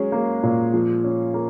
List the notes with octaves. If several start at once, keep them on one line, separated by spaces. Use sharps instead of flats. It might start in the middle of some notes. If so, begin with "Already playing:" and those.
Already playing: F#3 G#3 C#4 G#4
A#3
A#2
F3
C#4
A#3